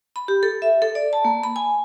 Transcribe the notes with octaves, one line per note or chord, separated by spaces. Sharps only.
B5
G4
A4
E5
A4
D5
A5
A#3
B5
G#5